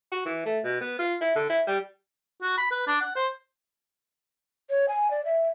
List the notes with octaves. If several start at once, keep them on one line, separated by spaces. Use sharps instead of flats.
F#4
E3
A3
B2
B3
F4
E4
D3
E4
G3
F#4
B5
B4
D4
F#5
C5
C#5
G#5
D5
E5